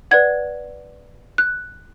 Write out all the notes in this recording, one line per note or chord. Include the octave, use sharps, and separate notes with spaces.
B4 D5 F#5 G#6
F#6